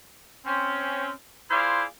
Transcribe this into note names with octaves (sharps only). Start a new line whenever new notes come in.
C4 C#4
E4 F4 G#4 C5 D5 F5